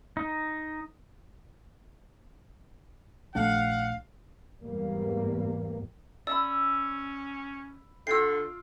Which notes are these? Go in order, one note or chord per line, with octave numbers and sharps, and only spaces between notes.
D#4
A#1 A3 D4 F5 F#5
E2 G#2 G3 A#3
C#4 D5 B5 E6
D3 F4 G5 E6 C7